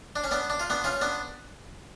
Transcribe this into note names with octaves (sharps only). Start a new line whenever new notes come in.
D4
C#4
B3 D4
D4
F4
B3 D4
C#4 F4
B3 D4